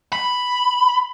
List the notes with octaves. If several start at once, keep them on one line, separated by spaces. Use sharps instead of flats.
B5